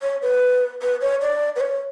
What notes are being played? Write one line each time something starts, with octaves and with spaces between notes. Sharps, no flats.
C#5
B4
B4
C#5
D5
B4
C#5